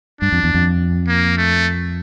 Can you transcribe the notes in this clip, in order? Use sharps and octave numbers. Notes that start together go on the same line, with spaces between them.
G2 D4
F2
E2
F2
A#3
A3